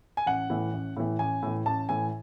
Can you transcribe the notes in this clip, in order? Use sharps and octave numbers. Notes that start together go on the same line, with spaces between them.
G#5
A1 F#5
A2 E3
A1
A2 E3
A1 G#5
A2 E3
A1 A5
A2 E3 G#5